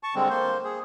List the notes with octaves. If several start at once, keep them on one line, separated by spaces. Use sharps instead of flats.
A5 C#6
D3 G3 G#3 C4
A#3 C5
G#4